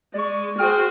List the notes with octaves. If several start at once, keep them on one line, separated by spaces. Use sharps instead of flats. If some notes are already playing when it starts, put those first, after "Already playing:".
G#3 D5 C#6
F#4 G#4 C5 G5 F6